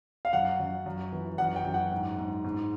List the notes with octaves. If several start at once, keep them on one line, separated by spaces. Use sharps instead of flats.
F5
F#2 F#5
F#2
F#2
E3
F#2 F#5
G5
F#2
F#5
G#2
G#2
G#2